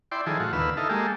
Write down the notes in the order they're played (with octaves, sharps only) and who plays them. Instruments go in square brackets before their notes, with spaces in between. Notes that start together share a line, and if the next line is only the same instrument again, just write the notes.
[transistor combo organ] E4 D5 G5 C6
D#3 F3 E4 G#4 A4
A2 F4 F#4
D#2 D3 B4 F5 E6
D#4 E4 A4 F5
G#3 A#3 G4 A4